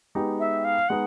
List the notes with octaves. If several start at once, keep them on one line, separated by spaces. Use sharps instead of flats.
G#3 B3 D#4 G4
E5
F5
G#3 B3 D#4 F#5